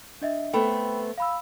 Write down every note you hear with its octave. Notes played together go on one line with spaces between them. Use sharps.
D4 D#5 E5
A3 B3 C4 G5 B5
F5 B5 E6